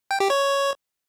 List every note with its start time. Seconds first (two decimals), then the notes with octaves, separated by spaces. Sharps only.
0.11 G5
0.20 G4
0.30 C#5